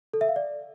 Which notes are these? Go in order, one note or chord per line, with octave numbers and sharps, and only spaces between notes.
A4
E5
F5
D5